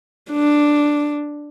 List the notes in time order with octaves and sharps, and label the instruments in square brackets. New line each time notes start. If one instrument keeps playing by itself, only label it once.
[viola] D4